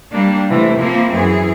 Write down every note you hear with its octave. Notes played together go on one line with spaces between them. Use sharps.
G3 A#3 D4
C3 E3 A3
F3 A#3 C4 E4
F#2 E3 G#4